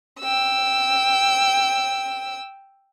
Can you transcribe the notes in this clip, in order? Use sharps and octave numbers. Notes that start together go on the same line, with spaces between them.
G5 E6